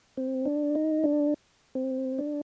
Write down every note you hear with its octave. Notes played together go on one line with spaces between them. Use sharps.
C4
D4
D#4
D4
C4
D4